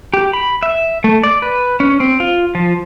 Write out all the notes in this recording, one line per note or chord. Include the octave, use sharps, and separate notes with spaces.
G4
B5
E5
A3
D5
B4
C#4
C4
F4
F3